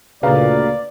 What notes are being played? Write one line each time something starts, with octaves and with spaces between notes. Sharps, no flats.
D2 A#2 C#3 B4 D5 F5 A#5